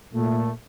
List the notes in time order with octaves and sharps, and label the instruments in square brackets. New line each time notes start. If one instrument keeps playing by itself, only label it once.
[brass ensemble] A#2 A3